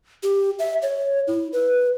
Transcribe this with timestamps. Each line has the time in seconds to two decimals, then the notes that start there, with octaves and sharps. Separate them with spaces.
0.23 G4
0.59 E5
0.82 C#5
1.27 E4
1.53 B4